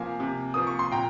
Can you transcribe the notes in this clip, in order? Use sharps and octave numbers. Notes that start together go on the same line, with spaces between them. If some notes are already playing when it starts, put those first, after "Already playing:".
Already playing: C3 F3 A#3 F5 G#5
C3
F3 A#3 D#6
C#6
C6
A#2 G5 A#5